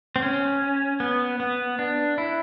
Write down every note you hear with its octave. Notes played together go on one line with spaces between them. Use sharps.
C4
C#4
B3
B3
D4
E4